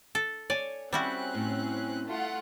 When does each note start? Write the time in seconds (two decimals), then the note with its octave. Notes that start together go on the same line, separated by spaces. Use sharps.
0.15 A4
0.50 C#5 D5 G#5
0.93 G3 C4 C#4 E4 F#4 F#5 F#6
1.35 A2
2.05 A3 F4 F#5